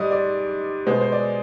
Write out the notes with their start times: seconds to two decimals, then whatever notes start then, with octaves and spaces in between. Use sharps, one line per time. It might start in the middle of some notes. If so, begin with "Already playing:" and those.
Already playing: G#2 G3 D5 D#5
0.11 D5
0.86 B2 G#3 B3 C5
1.01 C5
1.12 D5